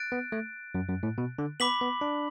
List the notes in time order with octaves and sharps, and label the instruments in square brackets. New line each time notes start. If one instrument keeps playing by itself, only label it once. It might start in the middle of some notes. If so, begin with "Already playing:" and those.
Already playing: [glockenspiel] F#6 A6 D7
[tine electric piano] B3
A3
F#2
F#2
A2
B2
D3
[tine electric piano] B3 [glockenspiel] B5 D6 B6 F#7
[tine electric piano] B3
D4